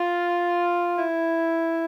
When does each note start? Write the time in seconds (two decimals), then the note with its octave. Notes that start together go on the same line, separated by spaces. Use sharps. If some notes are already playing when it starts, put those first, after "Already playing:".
Already playing: F4
0.98 E4